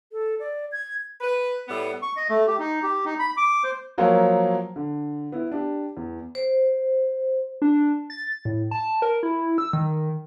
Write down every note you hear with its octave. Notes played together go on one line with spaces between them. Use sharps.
A4
D5
G#6
B4
A2 G3 B3
C#6
D#5
A3
G4
D#4
G4
D#4
B5
D6
C5
F3 F#3 A#3 A#4 C5 C#5
D3
B3 E4
D4 G4
E2
C5
D4
A6
A2
A5
A#4
E4
E6
D#3